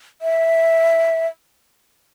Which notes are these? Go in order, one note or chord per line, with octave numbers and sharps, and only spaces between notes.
E5